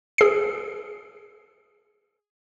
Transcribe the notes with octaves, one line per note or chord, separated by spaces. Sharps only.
G#4 C7